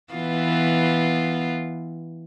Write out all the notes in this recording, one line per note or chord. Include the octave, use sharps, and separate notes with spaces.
E3 B3 F4